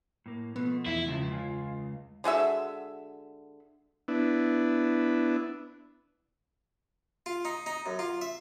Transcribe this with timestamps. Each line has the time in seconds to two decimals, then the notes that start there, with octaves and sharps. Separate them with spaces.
0.26 A2 A#3
0.56 B2 F3 A3 B3
0.86 E2 E4
1.08 C#2 C#3 F3
1.31 F4 F5 G#5
2.24 D3 G#3 F#4 E5
4.08 B3 D4 E4
7.26 F4
7.45 D#4
7.66 D#4
7.86 F#2
7.99 F4
8.21 E5